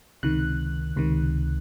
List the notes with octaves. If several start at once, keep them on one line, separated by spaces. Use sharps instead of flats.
C#2 C3 D#3 F#6
C#2 C3 D#3